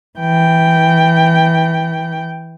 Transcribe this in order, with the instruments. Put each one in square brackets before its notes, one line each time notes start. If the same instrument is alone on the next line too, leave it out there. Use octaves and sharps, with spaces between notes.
[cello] E3 G5